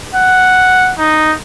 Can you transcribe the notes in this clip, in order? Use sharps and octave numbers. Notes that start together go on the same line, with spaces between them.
F#5
D#4